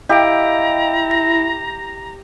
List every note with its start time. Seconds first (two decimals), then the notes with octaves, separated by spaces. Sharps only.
0.09 E4 G4 D#5 F5 A#5 D7
1.11 A#6